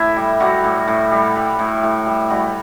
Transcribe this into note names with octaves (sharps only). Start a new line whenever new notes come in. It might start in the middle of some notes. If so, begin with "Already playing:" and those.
Already playing: A2 E4 E5
G3
F#3 G3 F#4
A2
A2
G3
G3
A2
A2
G3
F#3 G3 F#4